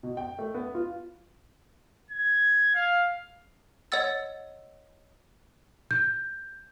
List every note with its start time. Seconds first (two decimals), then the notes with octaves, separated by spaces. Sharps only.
0.03 B2
0.17 G5
0.39 A3
0.54 B3
0.75 F4
2.10 G#6
2.75 F5
3.92 C#5 D#5 F#5 E6 A6
5.91 G6